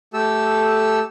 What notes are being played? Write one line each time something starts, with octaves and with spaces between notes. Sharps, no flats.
A3 G4 A4 E6